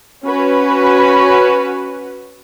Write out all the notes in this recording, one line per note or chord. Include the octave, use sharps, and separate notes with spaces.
C#4 F#4 B4